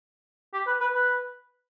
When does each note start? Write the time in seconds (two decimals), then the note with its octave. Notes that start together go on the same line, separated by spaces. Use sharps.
0.53 G4
0.67 B4
0.80 B4
0.93 B4